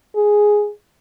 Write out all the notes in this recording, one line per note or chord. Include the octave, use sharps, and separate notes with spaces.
G#4